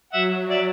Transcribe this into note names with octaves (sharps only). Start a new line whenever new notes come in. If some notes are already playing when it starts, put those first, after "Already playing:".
F#3 E5 F#5
D5 E5